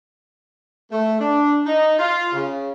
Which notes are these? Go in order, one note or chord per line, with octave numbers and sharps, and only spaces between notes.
A3
D4
D#4
F4
C#3